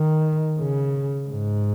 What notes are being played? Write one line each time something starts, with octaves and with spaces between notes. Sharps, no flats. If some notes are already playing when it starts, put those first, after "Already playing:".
Already playing: D#3
C#3
G#2